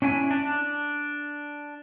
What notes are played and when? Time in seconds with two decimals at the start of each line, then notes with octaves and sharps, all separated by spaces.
0.02 C#4 D4 E4 G#5
0.31 D4